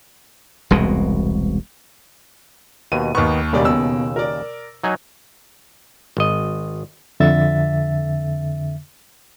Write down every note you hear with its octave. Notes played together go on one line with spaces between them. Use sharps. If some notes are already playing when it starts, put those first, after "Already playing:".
E1 C2 B2 G#3
D#2 B2 D#7
D#2 D#3 B3 C#6
E1 D#2 C#3 G3 D5
B2 E6
A#4 D5
F#3 D#4 G#5
G#1 D#5
F2 D3 E5 A6